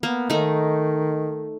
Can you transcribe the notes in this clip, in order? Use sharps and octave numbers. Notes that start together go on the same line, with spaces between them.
A#3 B3
D#3 A3 D#4